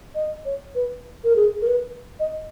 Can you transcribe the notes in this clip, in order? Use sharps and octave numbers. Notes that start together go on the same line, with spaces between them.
D#5
C#5
B4
A#4
G#4
A#4
B4
D#5